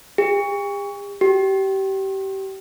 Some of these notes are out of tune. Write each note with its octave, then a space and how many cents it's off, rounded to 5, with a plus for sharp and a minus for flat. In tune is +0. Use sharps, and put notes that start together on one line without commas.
G4 +45
G4 -25